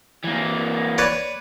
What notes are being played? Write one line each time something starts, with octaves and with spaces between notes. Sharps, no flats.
E3 A#3
B4 C#5 D5